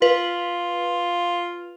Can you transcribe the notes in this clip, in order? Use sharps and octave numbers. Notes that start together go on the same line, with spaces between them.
F4 B4